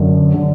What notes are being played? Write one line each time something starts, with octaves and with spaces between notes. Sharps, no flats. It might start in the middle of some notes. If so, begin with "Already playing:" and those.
Already playing: F#2 D3
D3